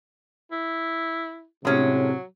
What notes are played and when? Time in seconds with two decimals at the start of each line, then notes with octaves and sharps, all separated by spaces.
0.52 E4
1.65 A2 C3 F#3 G#3 C#4